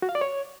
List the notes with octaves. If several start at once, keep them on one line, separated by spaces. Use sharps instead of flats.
F#4
F5
D5
C#5